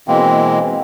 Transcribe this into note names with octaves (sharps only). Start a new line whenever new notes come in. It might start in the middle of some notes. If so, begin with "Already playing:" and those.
B2 E3 G#3 A#3 C4